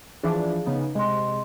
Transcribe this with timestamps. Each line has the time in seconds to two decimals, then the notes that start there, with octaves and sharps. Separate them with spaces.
0.23 E3 F3 D4 G#4 F5
0.66 C#3 B3 D#4
0.95 C3 G#3 D#5 C6